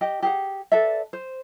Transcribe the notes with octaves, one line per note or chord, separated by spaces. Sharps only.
G4 D#5 G5
G4 G#4 F#5
A4 B4 D5 E5
C5